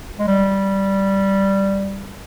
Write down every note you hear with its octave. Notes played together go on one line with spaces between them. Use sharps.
G#3
G3